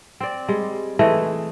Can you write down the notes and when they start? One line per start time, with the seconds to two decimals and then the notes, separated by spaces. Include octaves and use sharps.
0.20 C4 D5
0.48 G3 G#3
0.99 E3 G#3 A3 D#5